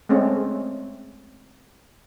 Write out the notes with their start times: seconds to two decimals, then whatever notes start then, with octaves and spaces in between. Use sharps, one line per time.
0.09 G#3 A3 C4 C#4